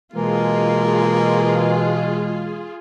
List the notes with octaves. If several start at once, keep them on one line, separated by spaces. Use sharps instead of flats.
B2 E3 G#3 A#3 F4 G#4